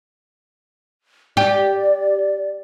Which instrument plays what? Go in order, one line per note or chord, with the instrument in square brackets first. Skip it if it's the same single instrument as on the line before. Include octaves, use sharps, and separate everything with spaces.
[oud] G4 [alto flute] D5